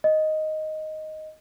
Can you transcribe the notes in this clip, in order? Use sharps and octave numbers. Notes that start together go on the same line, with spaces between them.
D#5